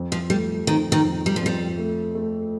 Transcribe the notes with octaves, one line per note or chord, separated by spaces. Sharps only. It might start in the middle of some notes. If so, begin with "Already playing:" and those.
Already playing: F2
F3
G3 A3
F2 D#3
D#3
F2
G3
F3
F2 G3
A3
A3